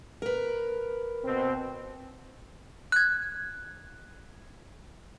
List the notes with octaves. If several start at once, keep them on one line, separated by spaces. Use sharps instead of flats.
A#4 B4
B2 C4
F#6 G#6